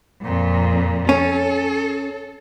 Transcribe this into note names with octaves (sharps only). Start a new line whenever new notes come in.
F2 A#2
C#4 A4